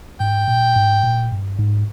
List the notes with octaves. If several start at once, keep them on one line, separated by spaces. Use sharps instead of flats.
G#2 G5
A#2
G#2
A#2
G2
G#2